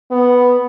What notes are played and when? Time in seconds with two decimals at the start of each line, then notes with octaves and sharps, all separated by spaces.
0.11 B3